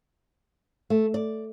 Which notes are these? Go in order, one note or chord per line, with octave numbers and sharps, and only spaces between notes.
A3
D5